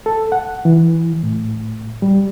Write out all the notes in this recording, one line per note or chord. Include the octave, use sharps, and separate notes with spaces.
A4
F#5
E3
A2
G3